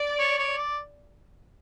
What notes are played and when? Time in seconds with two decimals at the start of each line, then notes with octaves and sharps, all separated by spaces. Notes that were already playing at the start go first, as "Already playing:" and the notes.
Already playing: D5
0.19 C#5
0.38 C#5
0.57 D5